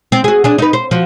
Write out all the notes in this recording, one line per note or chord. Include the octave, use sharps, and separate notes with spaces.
C4
F#4 G#4
D4 G#4
D#4 B4
C5
F3 F#4